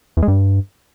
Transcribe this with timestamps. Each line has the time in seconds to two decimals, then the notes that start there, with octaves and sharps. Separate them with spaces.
0.17 E2
0.22 G#3
0.28 G2